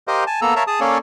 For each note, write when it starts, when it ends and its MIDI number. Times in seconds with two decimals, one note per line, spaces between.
0.08 0.24 67
0.08 0.24 70
0.08 0.24 72
0.08 0.24 75
0.08 0.24 77
0.27 0.40 80
0.27 0.40 81
0.42 0.54 58
0.42 0.54 59
0.42 0.54 69
0.42 0.54 82
0.42 0.54 88
0.56 0.63 70
0.56 0.63 73
0.56 0.63 76
0.56 0.63 77
0.56 0.63 81
0.56 0.63 82
0.67 0.80 68
0.67 0.80 81
0.67 0.80 87
0.80 0.98 58
0.80 0.98 61
0.80 0.98 69
0.80 0.98 73
0.80 0.98 74
0.80 0.98 77